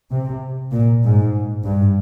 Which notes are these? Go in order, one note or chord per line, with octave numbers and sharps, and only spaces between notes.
C3
A#2
G#2
G2